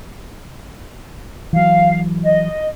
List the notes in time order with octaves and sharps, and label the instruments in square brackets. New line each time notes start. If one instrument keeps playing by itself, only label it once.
[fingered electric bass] E3 F#3 [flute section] F5
[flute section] D#5